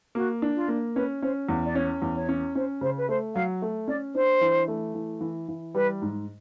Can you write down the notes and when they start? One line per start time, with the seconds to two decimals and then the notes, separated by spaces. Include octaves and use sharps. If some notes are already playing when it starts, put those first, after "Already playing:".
0.15 A#3 F#4
0.42 D4
0.55 F4
0.68 A#3
0.95 C#4 B4
1.22 C#4 C5
1.49 E2
1.65 D5
1.75 C#4 C#5
2.02 E2
2.15 C#5
2.29 C#4
2.55 C#4 C5
2.81 C#3 C5
2.97 B4
3.09 A3 C5
3.35 F#3 F5
3.62 A3
3.88 C#4 D5
4.15 D4 C5
4.41 E3
4.68 A3
4.94 E3
5.21 E3
5.48 E3
5.74 G3 B4
6.02 G#2